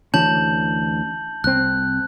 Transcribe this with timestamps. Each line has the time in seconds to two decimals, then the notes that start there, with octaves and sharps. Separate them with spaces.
0.14 D2 E3 C#4 A5 G6 F#7
1.44 C2 C4 F#6